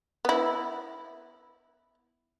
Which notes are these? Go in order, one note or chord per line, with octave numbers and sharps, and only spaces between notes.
B3 E4